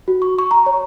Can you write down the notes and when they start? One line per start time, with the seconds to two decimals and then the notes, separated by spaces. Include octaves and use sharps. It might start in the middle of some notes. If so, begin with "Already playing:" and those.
0.08 F#4
0.22 C#6
0.39 C#6
0.51 A#5
0.66 C#5